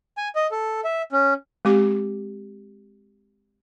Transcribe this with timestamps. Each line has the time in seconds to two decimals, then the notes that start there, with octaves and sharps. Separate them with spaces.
0.18 G#5
0.35 D#5
0.51 A4
0.84 E5
1.12 C#4
1.65 G#3 C4 G4 D6